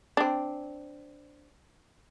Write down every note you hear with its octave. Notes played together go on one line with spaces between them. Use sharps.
C4 D4